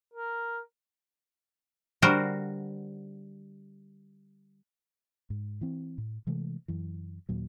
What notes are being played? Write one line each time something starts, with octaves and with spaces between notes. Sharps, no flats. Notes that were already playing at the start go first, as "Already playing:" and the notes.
A#4
D3 G3 F#4 A#4 C5
G#2
E3 C4
A2
C3 E3 G#3 A3
F#2 E3
D#2 A#2 F#3